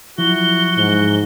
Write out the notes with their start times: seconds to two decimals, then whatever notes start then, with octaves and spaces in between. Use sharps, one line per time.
0.18 F3 F#3 E4 F#4 G7
0.77 G#2